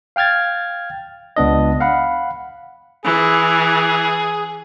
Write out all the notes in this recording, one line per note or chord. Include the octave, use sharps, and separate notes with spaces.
F5 G5 F6 G#6 A6
C#2 B3 D4 D#5
F5 F#5 B5
E3 G#4